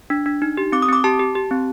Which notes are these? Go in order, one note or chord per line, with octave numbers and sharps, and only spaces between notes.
D4
D4
D#4
G4
C4 D6
D#6
C4 D6
G4 A5
G4
G4
C4